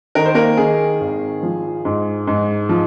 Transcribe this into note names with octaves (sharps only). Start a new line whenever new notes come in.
D#3 A#4
C5
A#3 A#4
D#3 G#4
G#1
F3
G#2
G#2
F3